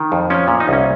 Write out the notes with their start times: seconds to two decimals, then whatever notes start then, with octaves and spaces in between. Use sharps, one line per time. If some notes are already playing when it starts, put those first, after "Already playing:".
Already playing: D#3
0.12 F2
0.30 F3 C#4
0.48 A#2
0.60 D#4
0.68 C2
0.73 C#4